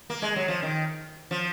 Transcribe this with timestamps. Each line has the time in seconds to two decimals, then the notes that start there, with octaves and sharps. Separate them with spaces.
0.10 A#3
0.22 G#3
0.36 F#3
0.48 F3
0.62 D#3
1.31 F3